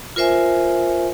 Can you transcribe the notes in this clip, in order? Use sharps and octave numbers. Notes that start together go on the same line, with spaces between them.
F4 A#4 C5 E5 G#5